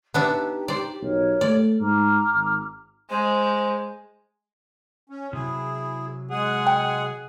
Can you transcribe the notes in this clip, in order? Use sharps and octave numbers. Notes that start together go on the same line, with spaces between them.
B3 D4 D#4 G4 E5
C5 D5
B1 G4 A#4 C#5
A3 D5
G#2 A#5 D6 F6
G#1
G#3 C5
C#4
C3 F#3 E4 G#4
G#3 G#4 F#5
G5